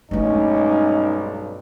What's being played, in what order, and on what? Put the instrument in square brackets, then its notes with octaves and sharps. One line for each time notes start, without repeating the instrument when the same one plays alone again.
[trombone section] B1 G2 [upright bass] G#3 A3 [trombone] C#4 [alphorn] D#4